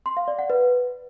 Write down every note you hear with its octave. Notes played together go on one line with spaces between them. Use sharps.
C6
F5
D5
F#5
B4